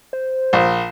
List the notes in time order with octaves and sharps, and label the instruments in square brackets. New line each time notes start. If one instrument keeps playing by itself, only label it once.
[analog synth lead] C5
[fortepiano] A#1